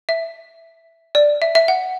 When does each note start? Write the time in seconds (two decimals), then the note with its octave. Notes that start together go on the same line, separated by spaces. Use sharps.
0.09 E5
1.15 D5
1.42 E5
1.55 E5
1.68 F#5